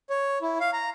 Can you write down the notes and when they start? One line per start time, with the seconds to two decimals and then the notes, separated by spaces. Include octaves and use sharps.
0.10 C#5
0.42 E4
0.60 F5
0.73 A#5